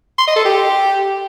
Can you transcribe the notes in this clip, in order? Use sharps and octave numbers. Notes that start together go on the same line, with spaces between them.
C6
D#5
A4
G4